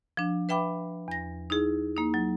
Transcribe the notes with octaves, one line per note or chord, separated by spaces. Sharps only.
F3 D4
B4 E5 G5 B5 D6
E2 A#6
D#4 E4 G#4
A#3 D#4
F#3